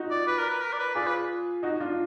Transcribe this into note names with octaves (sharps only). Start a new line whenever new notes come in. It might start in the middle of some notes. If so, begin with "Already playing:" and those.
Already playing: D#4 F4 F#4
D5
B4
A#4
B4
A#4
D5
B4
F4 G#4 D5
B4
D#4 F#4
D4 F4